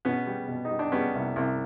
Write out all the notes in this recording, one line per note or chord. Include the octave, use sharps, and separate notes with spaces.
B2 B3 C#4
G3
B2
D#4
G3
D4
G3 B3 C#4
C2
C2